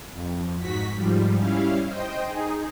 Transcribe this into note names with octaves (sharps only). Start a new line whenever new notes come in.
F2
G#2 F#4 B6
G#2 F3 G3
G3 C#4 E4 F5
C5 D#5 G5
D#4 G#4